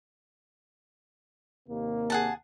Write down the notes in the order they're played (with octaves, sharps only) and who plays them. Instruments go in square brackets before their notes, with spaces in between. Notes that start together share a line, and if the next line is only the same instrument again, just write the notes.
[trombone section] D#2 C3 A#3
[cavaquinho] G#4 F#5 A5